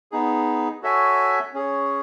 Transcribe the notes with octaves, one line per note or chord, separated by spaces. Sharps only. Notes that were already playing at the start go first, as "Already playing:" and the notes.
B3 D#4 G#4
F#4 A4 C#5 E5 G#5
C#4 G#4 C#5